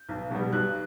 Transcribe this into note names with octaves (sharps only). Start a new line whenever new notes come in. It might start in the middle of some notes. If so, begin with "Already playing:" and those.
Already playing: G6
B1
B2 G3
B1 F#6